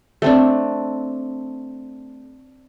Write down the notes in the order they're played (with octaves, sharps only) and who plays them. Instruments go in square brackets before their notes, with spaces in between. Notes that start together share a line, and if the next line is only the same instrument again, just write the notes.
[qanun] A3 C4 D4